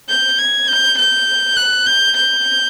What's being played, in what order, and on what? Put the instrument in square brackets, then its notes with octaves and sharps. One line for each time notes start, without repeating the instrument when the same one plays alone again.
[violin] G6
G#6
G6
G6
F#6
G6
G6